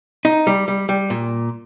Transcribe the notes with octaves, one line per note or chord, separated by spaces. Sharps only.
D#4
G3
G3
G3
A#2